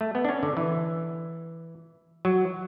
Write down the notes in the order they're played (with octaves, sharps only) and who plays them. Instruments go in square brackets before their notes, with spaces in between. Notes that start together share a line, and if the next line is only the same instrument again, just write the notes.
[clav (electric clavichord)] A3
B3
D4
C#4
D3
E3
F#3